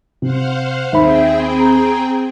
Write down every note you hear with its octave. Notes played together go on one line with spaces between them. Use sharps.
C3 C5 F5 F#5
D#2 C4 G#4 C5 E5 G5 B5
A#5